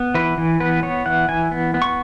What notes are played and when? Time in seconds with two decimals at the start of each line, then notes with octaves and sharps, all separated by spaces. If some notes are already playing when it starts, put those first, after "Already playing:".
Already playing: B3
0.15 E3 B4
0.38 E3
0.60 B3 B4
0.83 B3 C#5
1.06 E3 F#5
1.29 E3 G#5
1.51 B3
1.74 B3
1.82 C#6